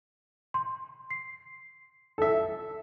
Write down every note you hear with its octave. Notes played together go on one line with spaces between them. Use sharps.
C6
C7
A4 E5